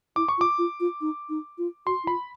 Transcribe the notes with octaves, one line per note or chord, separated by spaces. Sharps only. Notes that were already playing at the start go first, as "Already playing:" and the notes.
E4 D6
C#6
F4
D6
F4
F4
D#4
D#4
F4
F#4 C6
E4
F4 B5